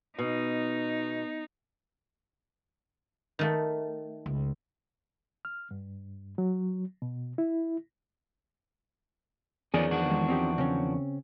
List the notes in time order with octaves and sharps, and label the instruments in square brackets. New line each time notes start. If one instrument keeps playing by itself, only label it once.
[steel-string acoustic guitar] B2 [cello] D#4
[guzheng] D#3 A3
[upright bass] C#2
[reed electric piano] F6
G2
F#3
B2
E4
[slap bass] E2 D#3 [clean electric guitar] F3 C#4 [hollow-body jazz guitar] G#4 D5
[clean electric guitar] F3 D4 F#4
[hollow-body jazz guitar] D#2 G#3
C4 D#4 G4
C#3 C4 C#4